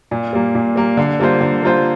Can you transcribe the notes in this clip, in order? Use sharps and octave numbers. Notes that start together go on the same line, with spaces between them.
A#2
G3 A#3
A#2
G3 A#3
D3
G3 A#3 F4 C5
D3
G3 A#3 F4 C5